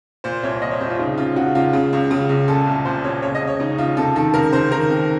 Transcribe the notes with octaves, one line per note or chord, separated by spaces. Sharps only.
A#2 C5
C2 C#5
A#2 D#5
C#5
C2 C5
F4
C#3 D#4
C#2 F4
C#3 F#4
C#2 F4
C#3
C#2
C#3
C#2
A#2 A4
C2
A#2 C5
C2 C#5
C#3 C#5
D#5
C#2
C#5
C#3 D#4
C#2 F4
C3 A4
D#3 A4
C#2 A#4
C#2 C5
D#3 A#4
F2